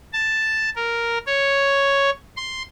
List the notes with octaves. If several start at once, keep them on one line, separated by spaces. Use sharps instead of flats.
A5
A#4
C#5
C6